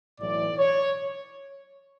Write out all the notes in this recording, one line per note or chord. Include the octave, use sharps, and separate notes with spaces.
B1 A2 E3 D5
C#5